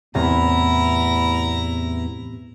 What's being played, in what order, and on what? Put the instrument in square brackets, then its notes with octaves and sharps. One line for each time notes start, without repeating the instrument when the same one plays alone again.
[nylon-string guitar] E2 [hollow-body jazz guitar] A2 C3 [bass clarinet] B3 [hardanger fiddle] E4 A#5